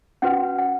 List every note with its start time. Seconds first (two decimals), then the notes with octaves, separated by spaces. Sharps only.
0.22 C#4 F#4 B4 F#5
0.58 F#5